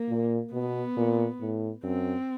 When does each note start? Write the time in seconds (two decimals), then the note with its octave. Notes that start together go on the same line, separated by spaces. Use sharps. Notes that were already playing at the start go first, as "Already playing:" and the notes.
Already playing: A#3
0.09 A#2
0.53 B2 B3
0.97 A#2
1.40 A2
1.84 F#2 C4